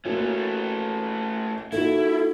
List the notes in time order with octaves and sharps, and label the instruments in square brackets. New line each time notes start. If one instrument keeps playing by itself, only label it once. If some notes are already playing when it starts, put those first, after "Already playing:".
[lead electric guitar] A3 C#4 [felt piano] A#3 F#4
[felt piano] A#3 D#4 F#4 [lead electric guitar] E4 [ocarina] A4